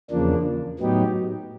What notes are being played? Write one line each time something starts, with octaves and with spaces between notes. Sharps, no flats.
E2 C#3 F3 A#3 D4
A2 F#3 B3 D#4 G4